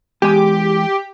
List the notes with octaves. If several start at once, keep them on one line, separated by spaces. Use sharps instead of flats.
E2 G#3 G4 G#5